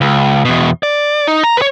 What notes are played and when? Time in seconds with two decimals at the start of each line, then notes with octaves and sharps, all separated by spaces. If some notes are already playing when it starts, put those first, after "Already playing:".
0.01 C#2
0.45 E2 B2
0.83 D5
1.27 D#4
1.44 A#5
1.57 B4 C#5